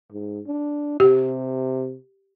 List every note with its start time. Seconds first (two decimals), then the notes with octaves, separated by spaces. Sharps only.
0.12 G#2
0.47 D4
1.00 C3 G4